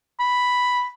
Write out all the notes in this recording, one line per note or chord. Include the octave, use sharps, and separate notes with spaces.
B5